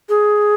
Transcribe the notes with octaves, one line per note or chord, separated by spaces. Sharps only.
G#4